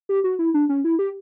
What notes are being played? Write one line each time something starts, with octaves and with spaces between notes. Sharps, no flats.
G4
F#4
E4
D4
C#4
E4
G4